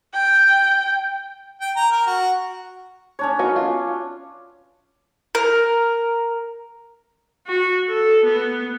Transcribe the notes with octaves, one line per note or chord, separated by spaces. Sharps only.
G5
G5
A#5
A#4
F#4
C#4 D4 C#5
B3 D#4 F#4
F4
A#4
F#4
A4
B3